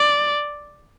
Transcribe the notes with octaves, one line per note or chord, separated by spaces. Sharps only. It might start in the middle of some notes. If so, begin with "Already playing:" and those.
Already playing: D5